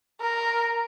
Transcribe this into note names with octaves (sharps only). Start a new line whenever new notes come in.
A#4